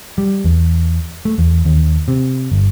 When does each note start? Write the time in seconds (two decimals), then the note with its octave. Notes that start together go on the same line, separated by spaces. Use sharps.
0.18 G3
0.45 E2
1.25 A3
1.38 E2
1.65 D#2
2.08 C3
2.52 G1